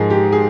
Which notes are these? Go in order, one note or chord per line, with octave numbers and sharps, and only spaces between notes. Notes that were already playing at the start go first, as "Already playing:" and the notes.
Already playing: G#2 F3 G#4 A#4
G4
G#4